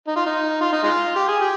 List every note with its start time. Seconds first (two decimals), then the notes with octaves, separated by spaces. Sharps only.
0.07 D#4
0.16 F4
0.26 D#4
0.61 F4
0.72 D#4
0.83 G#3 F4
1.15 G4
1.28 G#4
1.41 G4